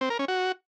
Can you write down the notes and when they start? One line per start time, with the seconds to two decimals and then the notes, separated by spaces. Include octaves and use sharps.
0.01 C4
0.10 A#4
0.19 C#4
0.28 F#4